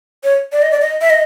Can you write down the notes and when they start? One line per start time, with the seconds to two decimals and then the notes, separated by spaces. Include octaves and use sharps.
0.24 C#5
0.52 D5
0.62 D#5
0.71 D5
0.81 D#5
1.01 E5
1.10 D#5